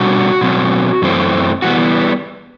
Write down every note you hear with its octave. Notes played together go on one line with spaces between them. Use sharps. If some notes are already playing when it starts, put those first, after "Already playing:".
Already playing: B2 G3 D4 F#4
B2 F#3 C4
F#2 E3 A3 C4
E3 G3 B3 F#4